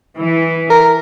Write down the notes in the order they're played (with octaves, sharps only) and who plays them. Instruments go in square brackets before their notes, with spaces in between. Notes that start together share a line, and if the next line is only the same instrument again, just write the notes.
[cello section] E3
[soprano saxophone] A#4